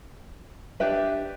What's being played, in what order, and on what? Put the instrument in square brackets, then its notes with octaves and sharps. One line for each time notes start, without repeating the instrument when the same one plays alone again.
[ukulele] D4 G4 B4 E5